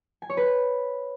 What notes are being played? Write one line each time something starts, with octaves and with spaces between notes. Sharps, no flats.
G#5
C#5
B4